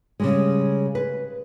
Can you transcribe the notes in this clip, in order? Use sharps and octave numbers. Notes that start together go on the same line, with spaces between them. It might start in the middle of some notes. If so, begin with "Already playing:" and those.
C#3 G3 G#3
B4